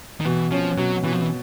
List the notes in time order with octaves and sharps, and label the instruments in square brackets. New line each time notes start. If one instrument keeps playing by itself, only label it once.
[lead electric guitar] D#3
[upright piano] B2 [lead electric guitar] E3
[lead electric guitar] F3 [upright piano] C#4
[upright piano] B2 [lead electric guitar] F#3
[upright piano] B2 [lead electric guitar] E3
[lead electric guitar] F3
E3